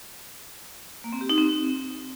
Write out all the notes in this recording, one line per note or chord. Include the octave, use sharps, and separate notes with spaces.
A#3
C4
G4
D#4
C4